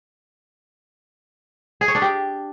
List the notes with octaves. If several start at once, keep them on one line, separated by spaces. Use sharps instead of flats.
G#4
C#5
D4
G4